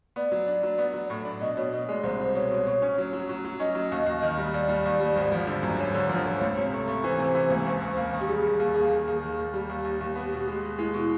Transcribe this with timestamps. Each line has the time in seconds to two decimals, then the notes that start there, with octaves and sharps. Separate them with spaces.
0.16 B3 D5
0.32 F#3
0.47 D4
0.63 F#3
0.78 B3
0.94 F#3
1.10 A2
1.25 D4
1.41 B2 D#5
1.57 B2 C#5
1.72 B2 D#5
1.88 G#3 D5
2.03 C2 C5
2.20 C4
2.35 B2 C#5
2.51 B2
2.66 B2
2.82 C#4
2.98 F#3
3.13 F#3
3.29 F#3
3.45 F#3
3.60 C#4 D#5
3.75 F#3
3.92 D#2
4.06 D#2
4.23 D#3
4.38 G3
4.54 D#2 D5
4.69 G3
4.85 D#2
5.00 G3
5.16 G#1
5.32 F3
5.47 D3
5.63 F#2
5.78 G#1 C#5
5.94 D3
6.09 F3
6.26 F3
6.41 C#2
6.57 C3
6.73 A3
6.88 A3
7.04 E3 C5
7.19 C3
7.35 E3
7.50 C#2
7.67 D#2
7.82 D#2
7.97 A#3
8.14 D#3
8.21 G4
8.29 G3 G#4
8.44 D#2
8.60 D#2
8.75 A#3
8.92 D#3
9.07 D#2
9.22 D#3
9.39 D#2
9.54 G3 G4
9.69 D#2
9.85 D#2
10.01 D#2
10.16 B3
10.32 B2
10.48 G#3
10.63 B2
10.79 G#3 E4
10.94 B2